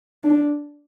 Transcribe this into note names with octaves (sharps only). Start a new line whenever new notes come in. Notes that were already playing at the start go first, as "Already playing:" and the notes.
D4